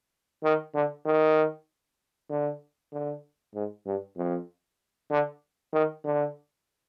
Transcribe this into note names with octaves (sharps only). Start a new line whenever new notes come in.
D#3
D3
D#3
D3
D3
G#2
G2
F2
D3
D#3
D3